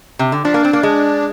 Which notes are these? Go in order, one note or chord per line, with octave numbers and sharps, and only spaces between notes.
C3
D3
F3 D4
A#3
C4
A#3
G#3